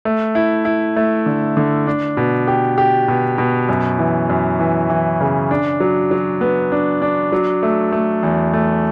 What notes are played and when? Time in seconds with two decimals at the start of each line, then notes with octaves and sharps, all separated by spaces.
0.05 A3
0.35 E4
0.65 E4
0.96 A3
1.26 D3
1.57 D3
1.87 D4
2.17 B2
2.48 G4
2.78 G4
3.08 B2
3.38 B2
3.69 F#2
3.98 E3
4.29 F#2
4.59 E3
4.90 E3
5.21 C#3
5.51 D4
5.80 F#3
6.11 F#3
6.41 B3
6.72 D4
7.02 D4
7.32 F#3
7.63 A3
7.92 A3
8.23 E2
8.53 A3